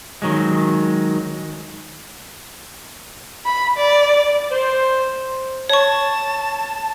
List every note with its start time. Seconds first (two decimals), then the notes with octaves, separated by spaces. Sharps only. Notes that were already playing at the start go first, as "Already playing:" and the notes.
0.22 D#3 F#3 G#3
3.45 B5
3.77 D5
4.51 C5
5.69 C#5 A5 C#6